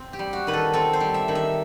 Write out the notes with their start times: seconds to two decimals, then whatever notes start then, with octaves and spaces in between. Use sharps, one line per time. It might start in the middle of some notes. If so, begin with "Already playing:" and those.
Already playing: C4
0.13 G4
0.19 G3
0.33 F#4
0.47 D#3 B4
0.53 A4
0.73 C4 A4
0.93 C5
1.00 G3
1.14 E5
1.28 D#3
1.35 E5